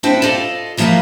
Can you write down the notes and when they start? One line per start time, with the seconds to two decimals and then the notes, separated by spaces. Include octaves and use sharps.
0.03 C4 D4 E4 C5 G5
0.22 F4 A4 D5 D#5
0.77 E3 F3 A#3 B3 A#4 B4